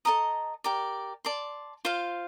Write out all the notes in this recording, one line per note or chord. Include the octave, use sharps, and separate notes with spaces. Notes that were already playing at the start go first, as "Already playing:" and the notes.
A4 D#5 A#5 D#6
G4 A#4 D5
D5 A5 C6
F4 C5 F5